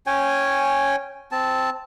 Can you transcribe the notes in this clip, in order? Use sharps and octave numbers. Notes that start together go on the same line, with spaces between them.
C#4 C#5 G5 G#5
C4 A5